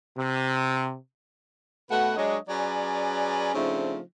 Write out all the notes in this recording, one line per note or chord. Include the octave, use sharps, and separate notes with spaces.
C3
B2 A3 F#4 B4 F#5
F#3 G#3 D4 C#5 D#5
F#3 C#4 G#4 B4 D5
C#3 F3 A3 C4 D4 D#4